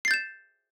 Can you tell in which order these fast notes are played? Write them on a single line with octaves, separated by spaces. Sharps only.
C7 A6 G6 E7